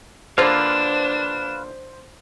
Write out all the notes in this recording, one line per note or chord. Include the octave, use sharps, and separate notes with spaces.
D3 A#3 D4 F4 B4 C5 F5 E7